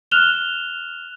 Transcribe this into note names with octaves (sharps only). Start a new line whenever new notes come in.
F6 F#6 E7 F7 G7